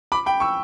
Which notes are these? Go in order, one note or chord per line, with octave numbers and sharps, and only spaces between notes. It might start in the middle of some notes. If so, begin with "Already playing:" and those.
B5 D6
G5 B5
C#6 E6